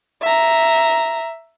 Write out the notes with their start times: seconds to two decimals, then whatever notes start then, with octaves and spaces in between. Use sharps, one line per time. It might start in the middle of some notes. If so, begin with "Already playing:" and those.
0.22 E5 A#5